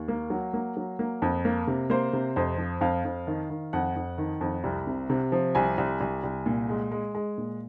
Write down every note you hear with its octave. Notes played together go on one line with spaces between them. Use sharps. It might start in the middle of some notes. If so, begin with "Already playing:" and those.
Already playing: D#2
A#3
F#3
A#3
F#3
A#3
F2
A#3
C3
A#3 C5
C3
F2 C5
F3
F2 F5
F2
D#3
D#3
F2 F#5
F2
D#3
F2
C2
C3
C3
F3
C2 G#5
C2
C2
C2
A#2
G#3
G#3
G#3
A#2